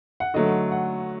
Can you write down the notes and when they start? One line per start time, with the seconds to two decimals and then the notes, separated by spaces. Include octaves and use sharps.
0.20 F#5
0.34 D3 F#3 A3 D#5
0.72 F#5